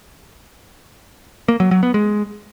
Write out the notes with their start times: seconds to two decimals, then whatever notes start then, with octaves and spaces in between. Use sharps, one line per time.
1.48 A#3
1.60 F#3
1.71 F#3
1.83 B3
1.94 G#3